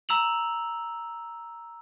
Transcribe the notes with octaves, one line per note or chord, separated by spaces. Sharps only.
A#5 E6 F7 F#7